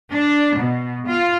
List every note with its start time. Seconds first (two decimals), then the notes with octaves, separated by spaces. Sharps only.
0.11 D4
0.58 B2
1.07 F4